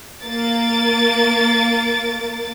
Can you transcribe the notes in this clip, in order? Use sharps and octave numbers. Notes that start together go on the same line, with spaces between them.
A#3 A6 D7